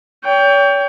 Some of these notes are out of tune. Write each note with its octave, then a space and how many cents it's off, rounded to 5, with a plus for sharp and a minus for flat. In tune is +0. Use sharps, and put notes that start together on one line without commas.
C#5 +40 G5 +10